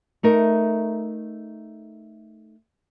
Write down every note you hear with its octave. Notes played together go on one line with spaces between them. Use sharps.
A3 D#4 A#4